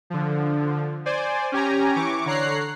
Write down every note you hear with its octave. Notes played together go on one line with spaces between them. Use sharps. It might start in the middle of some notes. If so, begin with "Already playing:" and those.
D3 F3
C5 D5 G#5
C#4 G4 G#5 A#5
E3 C#6 D6
D3 C#5 A#5 F#6 C7